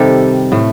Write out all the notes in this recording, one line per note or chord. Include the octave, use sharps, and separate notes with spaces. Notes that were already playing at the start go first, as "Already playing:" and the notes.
Already playing: C3 D#3 G3 A4
A2 A3